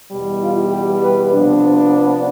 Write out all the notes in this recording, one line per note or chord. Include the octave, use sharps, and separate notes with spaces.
E2 B2 G3
F4
G4
B4
C3 F3 B3 D4
C5
B4